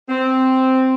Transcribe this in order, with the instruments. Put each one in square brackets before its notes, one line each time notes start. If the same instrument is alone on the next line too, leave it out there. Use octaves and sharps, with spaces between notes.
[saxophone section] C4